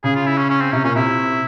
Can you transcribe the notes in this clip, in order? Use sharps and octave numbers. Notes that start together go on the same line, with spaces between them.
C#3 G#4
F4
E4
C#4
C#4
C4
C3 C#4
A#2 C#4
C3 E4